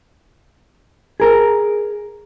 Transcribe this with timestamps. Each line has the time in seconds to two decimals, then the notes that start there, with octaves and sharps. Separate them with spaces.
1.20 G#4 A#4